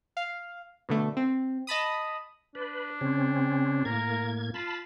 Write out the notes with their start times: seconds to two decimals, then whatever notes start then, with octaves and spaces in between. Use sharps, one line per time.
0.17 F5
0.89 B2 D3 A3
1.17 C4
1.67 D#5 A5 B5 D#6
2.55 D4 B4
3.01 C#3 C4 C#4
3.85 A2 A#3 A#4 G#6
4.54 F4 A5 B5